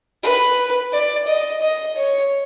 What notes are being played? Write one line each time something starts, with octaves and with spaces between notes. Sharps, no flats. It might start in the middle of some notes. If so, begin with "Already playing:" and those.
B4
D5
D#5
D#5
C#5